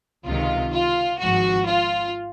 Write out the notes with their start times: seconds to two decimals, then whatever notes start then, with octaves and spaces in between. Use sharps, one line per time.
0.25 C#2 C3 D#3 F4
0.72 F4
1.19 G#1 G#2 F3 F#4
1.66 F4